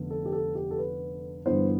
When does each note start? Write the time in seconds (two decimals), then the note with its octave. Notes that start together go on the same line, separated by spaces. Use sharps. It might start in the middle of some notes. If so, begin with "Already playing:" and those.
Already playing: F1 D3 B3
0.11 A4
0.25 G4
0.33 A4
0.55 G4
0.71 A4
0.78 B4
1.46 G1 G2 E3 B3 C5